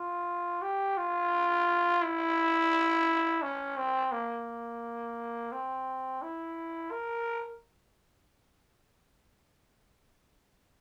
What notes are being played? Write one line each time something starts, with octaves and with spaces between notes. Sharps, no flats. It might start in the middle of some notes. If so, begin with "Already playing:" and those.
Already playing: F4
G4
F4
E4
C#4
C4
A#3
C4
E4
A#4